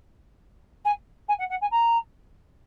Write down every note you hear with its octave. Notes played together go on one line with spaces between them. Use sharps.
G#5
G#5
F#5
F#5
G#5
A#5